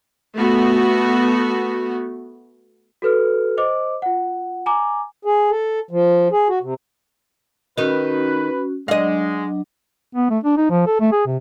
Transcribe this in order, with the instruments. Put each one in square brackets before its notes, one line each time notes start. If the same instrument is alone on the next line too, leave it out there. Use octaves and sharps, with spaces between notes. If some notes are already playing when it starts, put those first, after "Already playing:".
[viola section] A3 B3 F#4
[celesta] F#4 A4 B4 F6
C5 D#5 D6
F4 F#5
G#5 A#5 D6
[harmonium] G#4
A4
F3
G#4
F#4
C3
[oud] D#3 D#4 [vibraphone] C#4 F#4 [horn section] B4
[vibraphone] F#3 D4 [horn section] G#3 [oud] D#5 F5
[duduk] B3
A3
D4
D#4
F3
A4
A3
G#4
C3